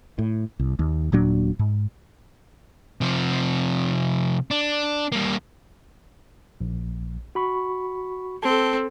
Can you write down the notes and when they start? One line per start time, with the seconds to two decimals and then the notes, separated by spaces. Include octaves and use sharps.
0.19 A2
0.59 C2
0.79 D#2
1.12 D#1 A#2 F#3 D4
1.59 G#2
3.01 C3 F3
4.51 D4
5.12 G3 A#3
6.61 A#1
7.35 F#4 B5 C#6
8.43 C4 A4 A5